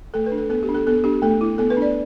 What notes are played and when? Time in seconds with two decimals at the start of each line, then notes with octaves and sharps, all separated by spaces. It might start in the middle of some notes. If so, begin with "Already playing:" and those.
0.14 A3 A4
0.26 B4
0.32 D4
0.38 A4
0.50 B3 A4
0.63 G4
0.69 D4
0.75 A4
0.87 B3 A4
1.04 D4 G4
1.22 A3 A4
1.41 E4
1.58 B3 A4
1.70 B4
1.77 D4
1.82 D5